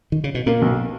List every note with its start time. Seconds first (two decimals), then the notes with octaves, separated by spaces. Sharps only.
0.12 D#3
0.24 C#3
0.35 B2
0.46 A#2 A#3
0.62 B1